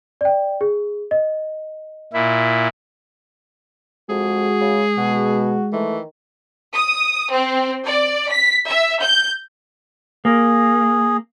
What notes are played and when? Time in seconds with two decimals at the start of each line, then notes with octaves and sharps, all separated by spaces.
0.21 D5 G5
0.61 G#4
1.11 D#5
2.13 A#2 E4
4.10 F2 G#3 F#4 G#4
4.61 C#3
4.98 B2 F#4
5.73 D#3 E3 A3
6.74 D#6
7.30 C4
7.85 D5
8.31 B6
8.68 E5
9.01 G6
10.25 A#3 G#4